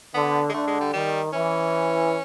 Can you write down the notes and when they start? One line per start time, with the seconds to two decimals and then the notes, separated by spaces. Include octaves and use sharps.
0.14 D3 B3
0.49 G#3
0.54 D3 A3
0.67 G#3
0.80 G3
0.93 D#3 G3
1.33 E3 C#4